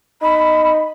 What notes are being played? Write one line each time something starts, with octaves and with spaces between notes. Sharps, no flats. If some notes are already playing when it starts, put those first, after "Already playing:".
D#4 B5